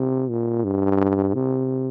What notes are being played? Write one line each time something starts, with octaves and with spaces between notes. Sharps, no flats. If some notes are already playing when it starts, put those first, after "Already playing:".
Already playing: C3
A#2
G2
C3